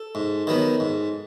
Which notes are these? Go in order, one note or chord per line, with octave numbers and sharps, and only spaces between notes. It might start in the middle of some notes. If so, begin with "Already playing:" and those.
Already playing: A4
G#2
D#3 F#3 B3
G#2